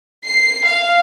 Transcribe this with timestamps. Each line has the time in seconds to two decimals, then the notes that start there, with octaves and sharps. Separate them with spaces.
0.24 C7
0.66 F5